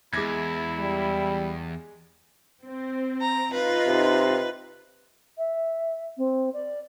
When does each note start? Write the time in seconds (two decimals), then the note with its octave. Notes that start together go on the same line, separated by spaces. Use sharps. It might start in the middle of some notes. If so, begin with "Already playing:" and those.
0.13 E2 G#3 E4 D6 G#6
0.79 G3
2.64 C4
3.21 A#5
3.53 D#4 F4 B4
3.87 C3
5.38 E5
6.17 C4
6.53 D5